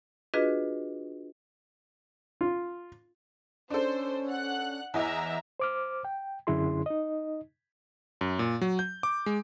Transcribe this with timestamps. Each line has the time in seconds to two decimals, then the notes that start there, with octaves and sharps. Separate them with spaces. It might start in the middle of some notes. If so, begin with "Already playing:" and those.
0.34 D4 F4 F#4 G#4 B4 D#5
2.41 F4
3.70 C#4 D4 A4 C5
4.27 F#5 F#6
4.94 E2 E3 D#5 E5 A#5
5.60 C5 D6 F6
6.05 G5
6.47 F#2 D3 C#4 E4 G#4 C6
6.86 D#4 D#5
8.21 F#2
8.39 A#2
8.61 F#3
8.79 G6
9.03 D6
9.26 G#3